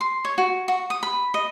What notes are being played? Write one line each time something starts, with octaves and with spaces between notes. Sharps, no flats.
C6
C#5
F#4
F#4
D#6
B5
D#5